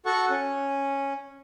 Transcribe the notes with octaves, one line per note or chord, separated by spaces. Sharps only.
F#4 A4 F#5 C#6
C#4